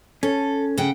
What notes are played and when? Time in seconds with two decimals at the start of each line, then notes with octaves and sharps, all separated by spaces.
0.23 C#4 A4
0.78 C#3 F#5 G5